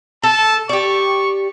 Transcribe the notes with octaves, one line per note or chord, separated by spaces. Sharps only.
A4 A5
G4 D5 C#6